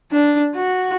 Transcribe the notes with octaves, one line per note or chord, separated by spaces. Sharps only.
D4
F#4